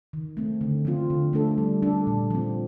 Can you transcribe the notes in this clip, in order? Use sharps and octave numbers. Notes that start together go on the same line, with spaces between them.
D#3
A3 C4
D3
F3 C4 F4
D3
A3 D4 A4
G3
D4 A4
A#2
F3 C4